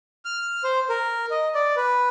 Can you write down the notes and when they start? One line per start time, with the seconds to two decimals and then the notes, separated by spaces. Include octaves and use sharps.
0.25 F6
0.64 C5
0.89 A#4
1.31 D#5
1.55 D5
1.76 B4